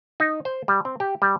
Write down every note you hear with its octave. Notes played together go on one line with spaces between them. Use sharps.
D#4
C5
G3
C4
G4
G3